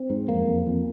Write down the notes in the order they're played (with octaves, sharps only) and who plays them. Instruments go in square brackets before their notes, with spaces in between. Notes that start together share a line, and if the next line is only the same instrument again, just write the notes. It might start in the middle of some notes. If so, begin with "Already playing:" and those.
Already playing: [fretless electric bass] C4
G#2
F2 A#3
F2
F2